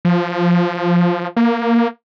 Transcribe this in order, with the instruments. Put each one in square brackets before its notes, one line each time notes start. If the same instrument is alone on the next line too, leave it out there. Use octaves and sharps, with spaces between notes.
[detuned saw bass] F3
A#3